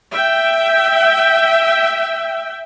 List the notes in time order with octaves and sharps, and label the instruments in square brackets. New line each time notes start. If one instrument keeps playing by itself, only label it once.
[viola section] E5 G5